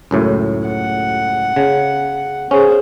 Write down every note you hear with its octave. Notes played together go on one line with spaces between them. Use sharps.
C#2 F#2 A2
F#5
C#3
C#4 G#4 C5